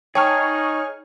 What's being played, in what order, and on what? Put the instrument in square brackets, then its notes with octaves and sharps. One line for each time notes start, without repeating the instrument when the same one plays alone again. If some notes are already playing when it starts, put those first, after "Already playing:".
[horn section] D#4 [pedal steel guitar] G#4 [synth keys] C#5 C#6 F6 [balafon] G5 A5